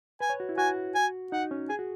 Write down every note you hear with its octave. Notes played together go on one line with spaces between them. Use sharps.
B4 G#5
C#5
F#4
E4
F#4 G#5
G#5
D#4 F#5
C#4
G#4 G#5
F#4